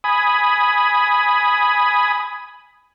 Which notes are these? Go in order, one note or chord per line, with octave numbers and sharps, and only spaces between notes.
G#5 B5 D#6